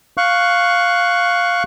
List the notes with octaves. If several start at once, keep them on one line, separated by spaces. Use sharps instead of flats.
F5 C#6 F#6